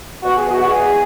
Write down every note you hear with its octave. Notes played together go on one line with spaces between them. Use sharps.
B2 F#4
G#4
E2
F#4
F#4
E2 G#4